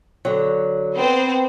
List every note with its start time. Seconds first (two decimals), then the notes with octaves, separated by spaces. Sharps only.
0.25 D3 F#3
0.95 B3 C4 C5